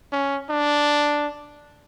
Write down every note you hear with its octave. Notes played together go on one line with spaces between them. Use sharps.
C#4
D4